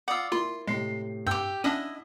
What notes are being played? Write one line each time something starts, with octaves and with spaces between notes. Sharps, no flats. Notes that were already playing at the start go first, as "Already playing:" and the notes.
F4 D5 F#5 D#6 E6
A#3 E4 F4 C6
A2 C3 G#3 C7
G2 G4 G5 E6
C#4 D4 E4 D5 D#5 F#5 D#6